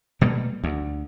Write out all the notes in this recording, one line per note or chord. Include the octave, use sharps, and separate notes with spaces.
B2 G3 A3 A#3
D2